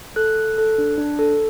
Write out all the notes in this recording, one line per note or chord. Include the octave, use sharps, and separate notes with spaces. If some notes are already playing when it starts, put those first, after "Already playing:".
A4 F#6
A4
A4
D4
D4
A4